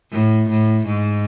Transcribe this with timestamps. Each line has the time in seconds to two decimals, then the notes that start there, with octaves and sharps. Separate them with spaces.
0.12 A2
0.50 A2
0.87 G#2